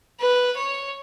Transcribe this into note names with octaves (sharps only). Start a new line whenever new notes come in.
B4
C#5